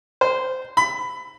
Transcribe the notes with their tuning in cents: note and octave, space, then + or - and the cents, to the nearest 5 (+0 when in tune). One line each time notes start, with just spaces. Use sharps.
C5 -15
B5 +20